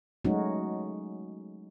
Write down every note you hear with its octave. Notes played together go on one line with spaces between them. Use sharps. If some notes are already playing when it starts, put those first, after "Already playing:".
F#3 G#3 A3 C#4 D#4 F#4